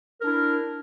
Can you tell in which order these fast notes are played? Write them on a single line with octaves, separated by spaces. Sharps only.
A#4 D4 E4